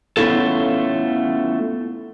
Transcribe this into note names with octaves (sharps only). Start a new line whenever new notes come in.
A3 B3 C#4 E4 F4 A4